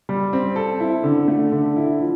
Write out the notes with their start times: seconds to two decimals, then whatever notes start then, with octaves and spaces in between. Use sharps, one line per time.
0.09 G3
0.33 C4
0.56 A4
0.80 E4
1.04 D3
1.28 A3
1.52 D3
1.76 E4
2.00 F3